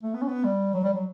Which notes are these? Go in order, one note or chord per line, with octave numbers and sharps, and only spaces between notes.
A3
B3
C#4
B3
G3
F#3
G3
F#3